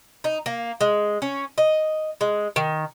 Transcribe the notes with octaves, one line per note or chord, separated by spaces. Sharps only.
D#4
A#3
G#3
C#4
D#5
G#3
D#3